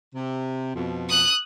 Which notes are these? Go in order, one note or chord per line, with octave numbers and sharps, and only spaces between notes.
C3
F2 B2
D#6 F#6